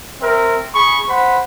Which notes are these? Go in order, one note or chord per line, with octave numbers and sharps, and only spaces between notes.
C4 A#4 E5
G#4 B5 C#6
C5 F#5 B5